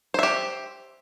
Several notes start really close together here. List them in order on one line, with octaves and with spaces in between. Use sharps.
C5 E5 G4